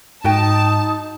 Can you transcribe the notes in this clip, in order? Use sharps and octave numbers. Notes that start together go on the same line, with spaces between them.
G#2 D#4 F#4 D#5 G5 A5